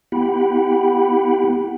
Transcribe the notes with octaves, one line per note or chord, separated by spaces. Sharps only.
B3 E4 G4 F#5 G5 B5